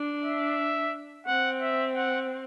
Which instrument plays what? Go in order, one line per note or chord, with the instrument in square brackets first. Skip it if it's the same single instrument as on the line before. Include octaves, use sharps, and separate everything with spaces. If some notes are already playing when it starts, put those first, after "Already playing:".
Already playing: [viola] D4
[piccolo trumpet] E5
[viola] C4 [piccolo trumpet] F#5
[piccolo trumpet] E5
F#5